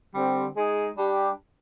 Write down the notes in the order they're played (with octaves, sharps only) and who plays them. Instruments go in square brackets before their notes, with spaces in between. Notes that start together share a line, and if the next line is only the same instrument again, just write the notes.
[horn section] D3 G3 C4 G4
G#3 D#4 G#4
G3 D4 G4